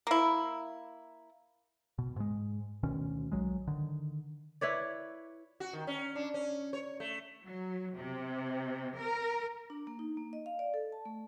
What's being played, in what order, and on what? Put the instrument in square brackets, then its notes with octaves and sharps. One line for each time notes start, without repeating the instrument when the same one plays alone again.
[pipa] A#3 E4
[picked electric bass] B2
G#2 G#3
D2 B2 D#3 C#4
B1 E2 F#3 G#3
D3 D#3
[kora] E4 B4 C#5 D5
[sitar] F#4
D#3
C#4
D4
C#4
C#5
A3
[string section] F#3
C3
A#4
[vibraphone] D4
A#3
D#4
A#3
D#5
F5
D5
A4
A5
A3